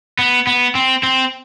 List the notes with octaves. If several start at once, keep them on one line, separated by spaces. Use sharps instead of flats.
B3
B3
C4
C4